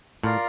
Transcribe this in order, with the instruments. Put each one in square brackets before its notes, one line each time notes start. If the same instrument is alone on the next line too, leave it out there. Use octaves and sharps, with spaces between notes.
[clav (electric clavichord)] A2 [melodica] F4 A#4 D5 F5